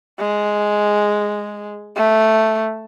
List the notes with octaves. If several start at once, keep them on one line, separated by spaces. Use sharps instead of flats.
G#3
A3